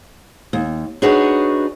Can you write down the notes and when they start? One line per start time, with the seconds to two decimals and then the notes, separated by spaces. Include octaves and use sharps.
0.53 D#2
1.02 D4 D#4 F#4 G#4 B4 C#5